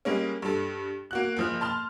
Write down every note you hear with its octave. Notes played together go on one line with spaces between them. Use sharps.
G3 G#3 A#3 C#4
G2 A4
A#3 F#4 F#6
F#1 F3 F6
A5 C6 F6